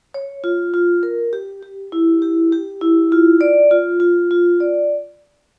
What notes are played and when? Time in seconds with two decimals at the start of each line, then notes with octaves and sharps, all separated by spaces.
0.14 C#5
0.44 F4
0.74 F4
1.03 A#4
1.33 G4
1.63 G4
1.92 E4
2.22 G4
2.52 G4
2.81 E4
3.12 F4
3.41 D5
3.71 F4
4.00 F4
4.31 F4
4.60 D5